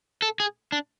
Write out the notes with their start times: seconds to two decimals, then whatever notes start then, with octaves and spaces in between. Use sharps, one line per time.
0.22 A4
0.40 G#4
0.72 D4